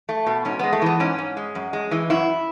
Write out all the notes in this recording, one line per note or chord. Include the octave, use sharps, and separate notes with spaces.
A3
B2
G#2 C#4
G#3 B3
A3
E3 B3
G#2 C#4
G#2
G#3
F#2
G#3
E3
F#2 E4